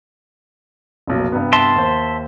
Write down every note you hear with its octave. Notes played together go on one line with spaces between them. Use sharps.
F1 B1 A#2
G2 C3 B3
E5 A5 C6
D#2 C5